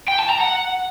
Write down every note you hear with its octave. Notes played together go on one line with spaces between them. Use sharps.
G5
A5
A#5
F#5